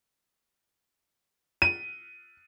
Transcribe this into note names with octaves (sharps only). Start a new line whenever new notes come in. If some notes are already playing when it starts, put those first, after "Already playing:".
D#7